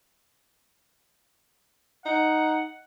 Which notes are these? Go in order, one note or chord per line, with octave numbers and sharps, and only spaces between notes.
D#4 F#5